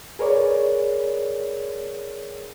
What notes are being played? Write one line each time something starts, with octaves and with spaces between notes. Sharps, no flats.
G#4 A#4 B4 C#5 D5